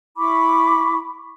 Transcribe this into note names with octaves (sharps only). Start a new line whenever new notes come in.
E4 B5 C#6 D6